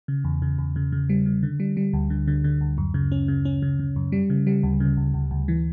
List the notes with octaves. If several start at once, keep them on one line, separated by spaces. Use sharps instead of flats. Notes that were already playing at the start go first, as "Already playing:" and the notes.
C#3
E2
C#3
E2
C#3
C#3
G3
C#3
D3
G3
G3
D2
D3
D3
D3
D2
F#2
C#3
C#4
C#3
C#4
C#3
C#3
F#2
G3
C#3
G3
D2
C#3
D2
D2
D2
E3